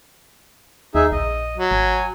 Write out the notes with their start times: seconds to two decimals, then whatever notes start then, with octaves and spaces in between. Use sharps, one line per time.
0.95 D#2 D#4 G#4 E5
1.12 A#1 D#5
1.57 F#3
1.71 G#1 G#5